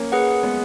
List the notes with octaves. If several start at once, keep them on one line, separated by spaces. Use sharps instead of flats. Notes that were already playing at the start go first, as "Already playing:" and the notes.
Already playing: A#3 C#4
G#4 B4 F#5
G#3 B3